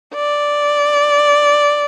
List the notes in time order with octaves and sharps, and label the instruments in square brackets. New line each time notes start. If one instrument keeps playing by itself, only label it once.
[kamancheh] D5